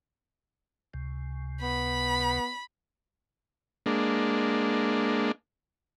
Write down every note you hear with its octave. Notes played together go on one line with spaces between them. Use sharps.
C#2 C3
B3 B5
G#3 A#3 D4